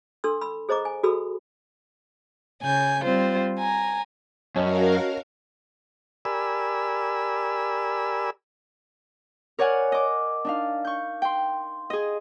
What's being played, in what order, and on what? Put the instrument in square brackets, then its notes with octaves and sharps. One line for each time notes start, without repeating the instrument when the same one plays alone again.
[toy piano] D4 A4 C6 E6
B5 E6
G#4 C5 D#5 A#5 D6
G#5
F#4 G#4 A4 B5 E6
[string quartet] C#3 G#5 G6
G3 C4 F4 C5
G#5 A#5
[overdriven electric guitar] F#2 [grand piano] C#4 [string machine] F#4 A#4 F5 [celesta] C#5 D#5 A5
[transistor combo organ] G4 A#4 D5 G#5 B5 E6
[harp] A#4 C#5 D5 F#5 G#5
D#5 D6
D4 D#4 F5
C#6 G6
G5 C6
G#4 D#5